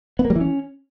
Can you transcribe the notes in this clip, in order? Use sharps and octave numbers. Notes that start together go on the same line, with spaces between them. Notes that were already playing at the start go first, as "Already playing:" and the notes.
B3
A#3
G3
E3
C#4